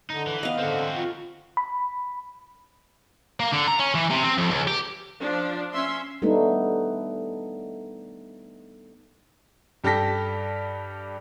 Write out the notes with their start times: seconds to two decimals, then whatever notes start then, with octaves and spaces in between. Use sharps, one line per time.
0.10 D3 D#4
0.27 E3
0.43 B3 D#5 F5
0.59 D3 C4 F#4
0.95 F4
1.57 B5
3.40 A#3
3.52 D3
3.68 A#5
3.80 C#4
3.95 E3
4.10 C3
4.23 C4
4.38 F2
4.51 C#2
4.67 G4
5.22 F3 D4
5.73 C#4 E5 C6
6.22 G3 A3 B3 D4 D#4 B4
9.84 G2 G4 A4 A5 A#6 B6